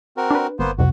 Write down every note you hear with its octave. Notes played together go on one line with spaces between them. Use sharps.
C4 F#4 A#4
D4 B4
G1 A#3 B3 C5
C2 F2 C3 F#4